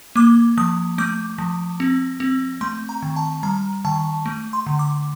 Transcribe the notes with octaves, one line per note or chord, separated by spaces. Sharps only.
A#3 D6
F3 D#6
A3 D6
F3
C4
C4
A3 C6
A#5
D#3
A5
G3 A#5
D#3 A5
A3
C6
D3
D6